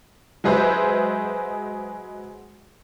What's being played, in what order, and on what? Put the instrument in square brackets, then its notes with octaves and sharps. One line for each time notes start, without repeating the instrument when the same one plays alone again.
[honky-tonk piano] F#3 G#3 G#4 B4 C5 E5